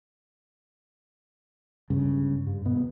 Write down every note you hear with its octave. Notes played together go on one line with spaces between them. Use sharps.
G1 C#2 G2 C#3
G2
D#1 B2 B3